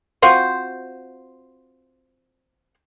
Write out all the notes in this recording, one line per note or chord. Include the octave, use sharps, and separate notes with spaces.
C4 F4 F#4 C5